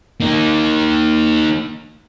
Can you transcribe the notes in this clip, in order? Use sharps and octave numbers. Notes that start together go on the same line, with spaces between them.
A#3 D#4